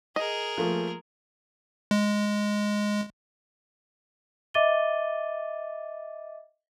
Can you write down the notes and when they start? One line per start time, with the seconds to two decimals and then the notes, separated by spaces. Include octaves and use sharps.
0.16 G#4 A#4 D#5
0.57 F3 A3 A#3
1.91 G#3
4.54 D#5 E5 D6 A6 D#7 G7